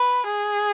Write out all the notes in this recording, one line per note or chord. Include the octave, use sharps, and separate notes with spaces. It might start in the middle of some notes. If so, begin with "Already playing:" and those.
Already playing: B4
G#4